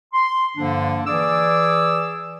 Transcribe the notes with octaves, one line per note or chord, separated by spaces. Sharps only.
C6
G2 D3 F3 A#3 D4
E3 G#4 D5 D6 E6